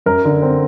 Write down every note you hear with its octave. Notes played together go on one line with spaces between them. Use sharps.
F#2 A#4
D3
C4